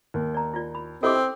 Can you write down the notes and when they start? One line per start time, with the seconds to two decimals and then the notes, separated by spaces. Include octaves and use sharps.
0.14 D#2
0.34 D5 A#5
0.54 E4 F4 D5
0.75 B5
1.03 C4 E4 G4 A4 D#5 D6
1.15 G5